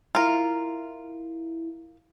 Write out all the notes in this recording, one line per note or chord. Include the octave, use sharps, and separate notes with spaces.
E4 F4 A#4